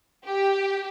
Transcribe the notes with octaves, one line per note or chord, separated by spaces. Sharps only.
G4 G5